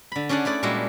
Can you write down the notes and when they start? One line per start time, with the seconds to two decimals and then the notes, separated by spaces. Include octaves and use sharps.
0.12 D3 B5
0.29 C#4 D4 G#4 D5 F#5
0.45 A3 E4 D5 F#5
0.63 A#2 G3 G#3 E4 F#4